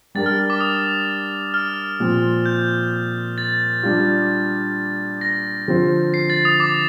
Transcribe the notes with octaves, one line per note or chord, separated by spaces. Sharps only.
G3 D4 G4 A#4 A6
F6
F6
D6
D#6
F6
A#2 F3 C4
G6
A6
G3 D4 F4
A#6
D3 F3 C4 F4 C5
C7
A6
D#6
D6